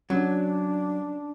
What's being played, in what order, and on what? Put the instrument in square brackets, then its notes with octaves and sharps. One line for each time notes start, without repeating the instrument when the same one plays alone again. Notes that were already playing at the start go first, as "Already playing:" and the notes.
[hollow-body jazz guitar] F#3 [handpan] C#4 [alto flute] D4